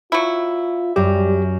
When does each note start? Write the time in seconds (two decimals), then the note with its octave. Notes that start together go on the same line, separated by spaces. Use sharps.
0.12 F#3 E4 F4
0.96 F#2 G3 G4